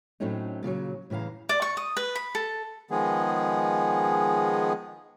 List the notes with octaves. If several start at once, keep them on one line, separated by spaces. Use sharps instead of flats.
A2 F#3 A3 C4 C#4 D#4
A#2 C#3 F3 F#3
A2 C#3 E3 F5 A#5
D5
C#6
D#6
B4
B5
A4
D#3 F3 G#3 B3 G#4